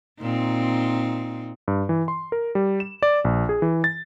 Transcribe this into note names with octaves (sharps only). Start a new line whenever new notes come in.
A#2 C4 D#4
G2
E3
C6
A#4
G3
E7
D5
A#1
G#4
E3
A6